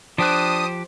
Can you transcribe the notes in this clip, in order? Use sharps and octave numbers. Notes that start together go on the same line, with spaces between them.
F3 D4 G4 C5 D#6 F#6